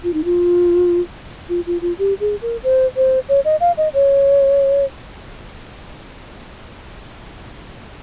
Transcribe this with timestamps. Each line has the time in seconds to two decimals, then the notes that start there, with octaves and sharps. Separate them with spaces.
0.04 F4
0.13 D#4
0.24 F4
1.49 F4
1.66 F4
1.81 F4
1.98 G4
2.20 G#4
2.42 A#4
2.63 C5
2.96 C5
3.29 C#5
3.45 D#5
3.60 F5
3.77 D#5
3.94 C#5